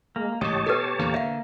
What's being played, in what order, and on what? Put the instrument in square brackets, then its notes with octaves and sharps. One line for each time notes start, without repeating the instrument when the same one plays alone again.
[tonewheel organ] G#3 [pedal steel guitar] A#3
[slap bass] A1 G#2 C#3 [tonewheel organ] G4 C#5 A5 [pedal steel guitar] D#5
[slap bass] B2 [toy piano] A4 B4
[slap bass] E2 A#2 D3 [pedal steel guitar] A#3
[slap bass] D3 [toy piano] E5 F5